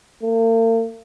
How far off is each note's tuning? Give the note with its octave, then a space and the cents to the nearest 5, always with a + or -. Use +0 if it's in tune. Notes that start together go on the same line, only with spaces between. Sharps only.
A#3 -45